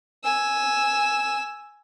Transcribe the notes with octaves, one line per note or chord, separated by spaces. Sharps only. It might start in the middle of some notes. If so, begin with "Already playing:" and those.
G#5 E6